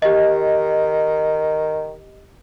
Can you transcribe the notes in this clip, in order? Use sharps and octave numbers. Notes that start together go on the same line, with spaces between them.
D#3 G4 D#5